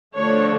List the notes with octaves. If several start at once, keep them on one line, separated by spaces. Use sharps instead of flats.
D3 F3 A3 D4 C#5